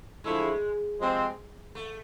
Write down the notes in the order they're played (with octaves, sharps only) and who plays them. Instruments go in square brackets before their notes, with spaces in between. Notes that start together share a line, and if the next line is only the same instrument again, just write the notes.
[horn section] D3 F3 A3 E4 [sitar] G#3
[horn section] C3 F3 G#3 C4
[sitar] A3